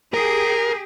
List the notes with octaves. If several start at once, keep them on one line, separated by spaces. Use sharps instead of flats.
G4 G#4 A#4